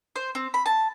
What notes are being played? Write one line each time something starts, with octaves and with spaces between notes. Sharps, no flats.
C5
C4
B5
A5